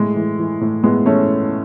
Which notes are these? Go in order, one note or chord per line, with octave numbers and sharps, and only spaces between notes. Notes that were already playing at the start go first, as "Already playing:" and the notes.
Already playing: A2 G#3
E3
E3
A2
A2 G#3 B3
E3 A3 C#4